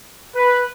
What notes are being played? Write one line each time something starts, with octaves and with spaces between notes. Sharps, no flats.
B4